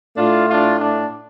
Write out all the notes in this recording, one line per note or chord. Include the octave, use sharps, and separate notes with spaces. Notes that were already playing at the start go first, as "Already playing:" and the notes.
A2 A3 D4 F4
D4 F4
D4